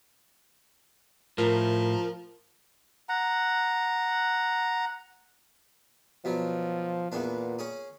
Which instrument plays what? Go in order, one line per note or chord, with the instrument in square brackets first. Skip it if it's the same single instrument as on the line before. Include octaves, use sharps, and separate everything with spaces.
[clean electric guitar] A2 [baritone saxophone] F3 [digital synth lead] A#4
[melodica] F#5 A#5
[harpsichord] B2 F#3 [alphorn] F3
[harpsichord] E2 B3 D4 [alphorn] A#2
[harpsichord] C#4 G#4